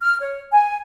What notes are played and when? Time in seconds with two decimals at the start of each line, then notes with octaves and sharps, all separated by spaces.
0.01 F6
0.20 C#5
0.52 G#5